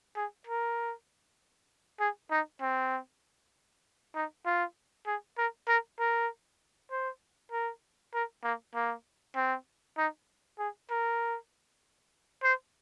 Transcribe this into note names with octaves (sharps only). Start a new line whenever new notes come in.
G#4
A#4
G#4
D#4
C4
D#4
F4
G#4
A#4
A#4
A#4
C5
A#4
A#4
A#3
A#3
C4
D#4
G#4
A#4
C5